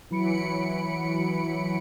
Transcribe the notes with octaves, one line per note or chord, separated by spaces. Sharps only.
E3 F#3 B5 C#7 D7